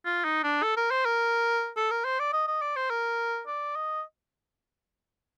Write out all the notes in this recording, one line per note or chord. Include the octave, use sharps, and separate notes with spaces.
F4
D#4
D4
A4
A#4
C5
A#4
A4
A#4
C5
D5
D#5
D#5
D5
C5
A#4
D5
D#5